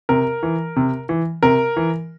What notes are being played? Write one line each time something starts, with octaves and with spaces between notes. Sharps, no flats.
C3 A#4
E3
C3
E3
C3 A#4
E3